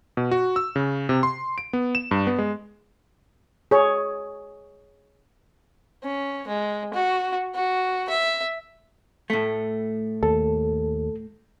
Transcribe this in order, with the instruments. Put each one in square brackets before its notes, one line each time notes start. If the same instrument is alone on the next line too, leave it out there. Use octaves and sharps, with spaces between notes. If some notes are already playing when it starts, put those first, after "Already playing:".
[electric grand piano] B2
F#4
E6
C#3
C3
C6
D7
B3
E7
G2
B3
G#3
[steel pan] G#4 C#5
[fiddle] C#4
G#3
F#4
F#4
E5
[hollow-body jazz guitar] A2 A3
[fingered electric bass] D#2 [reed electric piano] A4